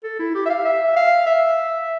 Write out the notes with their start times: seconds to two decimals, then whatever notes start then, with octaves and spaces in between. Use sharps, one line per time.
0.04 A4
0.19 E4
0.35 G4
0.45 E5
0.50 F5
0.65 E5
0.96 F5
1.26 E5